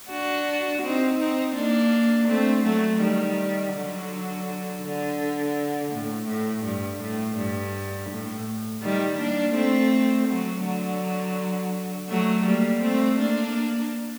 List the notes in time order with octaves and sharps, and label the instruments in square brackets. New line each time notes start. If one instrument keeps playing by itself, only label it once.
[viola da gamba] D4 F#4
C4 D#4
C4 D#4
A#3 D4
A3 C4
F#3 A3
D#3 G3
D3 F#3
D3
A2
A2
G2
A2
G2
A2
D#3 G3
A#3 D4
A3 C4
F#3 A3
D3 F#3
F#3 A3
G3 A#3
A3 C4
A#3 D4